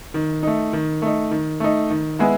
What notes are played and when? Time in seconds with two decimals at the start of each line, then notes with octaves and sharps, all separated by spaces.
0.14 D#3
0.43 A3 D#4
0.73 D#3
1.02 A3 D#4
1.31 D#3
1.60 A3 D#4
1.90 D#3
2.19 G#3 B3 E4